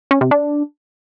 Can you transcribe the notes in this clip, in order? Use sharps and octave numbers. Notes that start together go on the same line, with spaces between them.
C#4
C3
D4